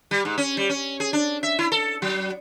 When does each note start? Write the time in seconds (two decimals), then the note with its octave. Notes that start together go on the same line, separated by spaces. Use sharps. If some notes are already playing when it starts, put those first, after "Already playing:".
0.11 G3
0.25 G#2
0.38 C#4
0.57 G3
0.69 C#4
1.00 G#4
1.13 D4
1.43 E5
1.59 E4
1.72 A4
2.02 F#3